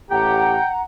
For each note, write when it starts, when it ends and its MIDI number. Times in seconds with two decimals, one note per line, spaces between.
0.11 0.57 33
0.11 0.57 45
0.11 0.57 67
0.11 0.82 78
0.11 0.69 79
0.11 0.82 82